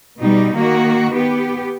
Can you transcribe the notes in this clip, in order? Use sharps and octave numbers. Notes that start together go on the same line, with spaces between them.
B2 G3 D#4
D#3 A#3 F#4
B3 G4